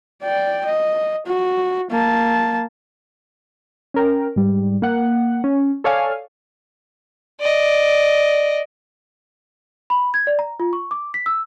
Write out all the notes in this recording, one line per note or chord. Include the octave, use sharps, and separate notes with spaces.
D5 G5
D#5
F#4
A#3 A5
C#4 A#4 G5
G#2 G3
A#3 F#5
C#4
A4 C#5 D5 F5 G#5
D5 D#5
B5
G#6
D5
A#5
F4
C#6
D6
B6
E6